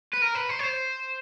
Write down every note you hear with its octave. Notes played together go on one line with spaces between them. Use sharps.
B4
A#4
B4
C5
C#5
C5